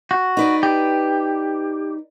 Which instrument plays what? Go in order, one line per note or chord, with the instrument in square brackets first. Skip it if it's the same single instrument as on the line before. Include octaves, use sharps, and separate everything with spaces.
[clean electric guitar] F#4
[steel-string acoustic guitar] D#4 B4 D5
[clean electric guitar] G4